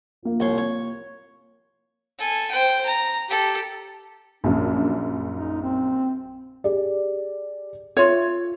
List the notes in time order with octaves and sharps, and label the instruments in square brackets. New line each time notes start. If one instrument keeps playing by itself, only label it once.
[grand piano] F3 A#3
[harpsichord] C2 C#5 C6
C#5
[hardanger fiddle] A4 G#5
C5 G5
A#5
G4 A4
[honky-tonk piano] A#1 F#2 [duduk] D4
[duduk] D#4
C4
[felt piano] G4 G#4 D5
[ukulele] F4 C#5 [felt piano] E5